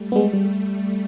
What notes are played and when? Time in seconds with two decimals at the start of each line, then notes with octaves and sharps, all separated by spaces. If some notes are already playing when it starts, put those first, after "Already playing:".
Already playing: G3 A3
0.12 G#3 B3
0.33 G3